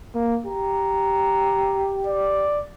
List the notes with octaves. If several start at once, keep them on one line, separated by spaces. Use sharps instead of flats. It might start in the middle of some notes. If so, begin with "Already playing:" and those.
A#3
G4 A#5
D5